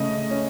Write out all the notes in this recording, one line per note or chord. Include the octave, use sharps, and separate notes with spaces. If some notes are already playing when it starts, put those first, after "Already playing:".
Already playing: C#3 A3 D#5
C#4